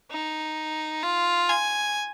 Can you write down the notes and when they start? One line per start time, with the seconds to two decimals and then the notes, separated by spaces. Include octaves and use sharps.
0.11 D#4
1.03 F4
1.49 G#5